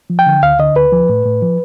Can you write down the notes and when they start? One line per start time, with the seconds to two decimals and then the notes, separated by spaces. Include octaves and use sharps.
0.10 F3
0.19 G5
0.26 D3
0.43 D2 F5
0.59 D3 D#5
0.76 D2 B4
0.92 F3
1.09 A2
1.26 A2
1.42 F3